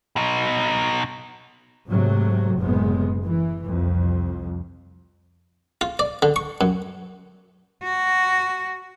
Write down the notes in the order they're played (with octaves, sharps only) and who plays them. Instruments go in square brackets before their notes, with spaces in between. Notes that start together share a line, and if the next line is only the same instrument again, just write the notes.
[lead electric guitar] B2 D#4
[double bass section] G#2 C3 F#3 A3
F#1 A2 C3 G#3 B3
E3
C2 F2
[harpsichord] F4
D5
D3
C#6
F#2
[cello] F#4